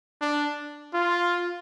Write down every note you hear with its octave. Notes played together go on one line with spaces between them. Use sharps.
D4
F4